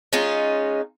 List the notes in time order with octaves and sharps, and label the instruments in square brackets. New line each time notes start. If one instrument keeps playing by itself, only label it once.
[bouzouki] G#3 C#4 D#4 F4